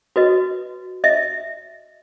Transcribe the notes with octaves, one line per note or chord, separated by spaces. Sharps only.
F#4 B4 D#5
D#5 E5